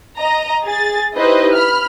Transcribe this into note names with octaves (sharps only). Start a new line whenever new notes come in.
D#5 A#5
G#4 A6
D#4 E4 G4 B4 C5 D#5
B5 F6